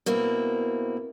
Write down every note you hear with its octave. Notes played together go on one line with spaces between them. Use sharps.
B2 A#3 C4 E4